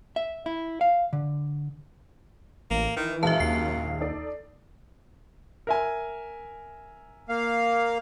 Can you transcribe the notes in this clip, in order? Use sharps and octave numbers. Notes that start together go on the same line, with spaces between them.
E5
E4
F5
D3
A1 A#3
D#3 E3
A#1 F#2 G#3 E5 F5 A5
D#2 C7
D#4 A4 D5
A#4 E5 G#5
A#3 F5